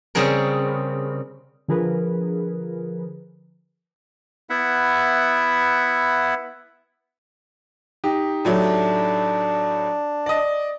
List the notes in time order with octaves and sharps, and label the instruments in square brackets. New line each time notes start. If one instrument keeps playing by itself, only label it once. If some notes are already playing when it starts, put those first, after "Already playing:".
[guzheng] C#3 G3 C4 G#4 A#4
[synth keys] D3 F3 G#4 A#4 B4
[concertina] B3 E4 E5 F#5
[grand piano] D#4 G4
[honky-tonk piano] A2 F#3 A3 [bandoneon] D4
[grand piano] D5 D#5